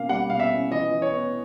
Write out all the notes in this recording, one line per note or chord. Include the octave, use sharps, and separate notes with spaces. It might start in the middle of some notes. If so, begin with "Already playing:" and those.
Already playing: B2 A#3 C#4 F5
G3 F#5
B2 F5
E5
C#4
E3 D#5
E3
C#5
B3